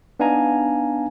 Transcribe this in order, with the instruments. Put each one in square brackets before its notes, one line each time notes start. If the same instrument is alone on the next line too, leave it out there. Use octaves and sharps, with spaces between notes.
[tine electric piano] B3 D4 D#4 F5 G#5 A#5